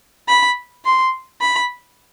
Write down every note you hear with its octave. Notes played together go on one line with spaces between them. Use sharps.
B5
C6
B5